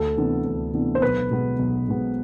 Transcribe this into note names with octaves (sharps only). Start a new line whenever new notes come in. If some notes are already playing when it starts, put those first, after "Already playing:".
Already playing: D2 A4
C3 E3 B3 D4
D2
C3 E3 B3 D4
C5
B1 B4
B2 G#3 B3
B1
B2 G#3 B3